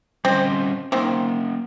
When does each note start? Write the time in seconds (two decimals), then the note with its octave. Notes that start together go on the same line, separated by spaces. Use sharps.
0.25 G3 C4 C#4 C5 D#5
0.92 D#3 A#3 C4 C#4